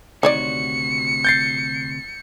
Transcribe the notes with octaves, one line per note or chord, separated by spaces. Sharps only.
D2 C3 D#3 F#4 C#5 D5 C#7
G6 A6 C7